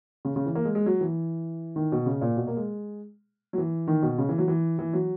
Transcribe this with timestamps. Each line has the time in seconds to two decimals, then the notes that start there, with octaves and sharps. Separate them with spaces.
0.25 C#3
0.36 C#3
0.46 E3
0.55 A#3
0.65 G#3
0.75 G#3
0.86 F#3
1.01 E3
1.76 D#3
1.92 B2
2.06 C#3
2.21 A#2
2.37 B2
2.47 A#3
2.57 G#3
3.53 F#3
3.58 E3
3.87 D#3
4.03 B2
4.18 C#3
4.29 E3
4.38 F#3
4.48 E3
4.79 E3
4.93 F#3